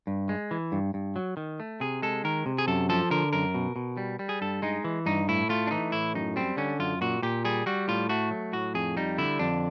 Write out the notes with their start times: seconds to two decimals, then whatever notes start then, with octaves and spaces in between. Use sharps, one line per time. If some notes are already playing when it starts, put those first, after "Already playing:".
0.07 G2
0.29 G#3
0.51 E3
0.72 G2
0.94 G2
1.16 F#3
1.37 D#3
1.60 A3
1.80 C3 G#4
2.02 G#3 A4
2.24 D#3 A#4
2.46 C3
2.58 G#4
2.67 F#2 A4
2.89 F3 A4
3.11 D3 A#4
3.33 F#2 A#4
3.54 B2
3.76 B2
3.97 G3
4.19 G3
4.29 G#4
4.41 G2 A4
4.62 G#3 D#4
4.84 E3
5.06 G2 D#4
5.28 A2 E4
5.49 A3 F4
5.67 D4
5.71 E3 D#4
5.92 A2 E4
6.15 F#2 D#4
6.36 G3 C4
6.57 D3 C#4
6.79 F#2 F4
7.01 A#2 F#4
7.22 A#2 G4
7.45 G3 G#4
7.66 G3 F#4
7.88 A2 F4
8.09 A3 F#4
8.31 F#3
8.53 A2 F#4
8.75 F2 G#4
8.97 G3 D#4
9.18 D3 E4
9.39 F2 D4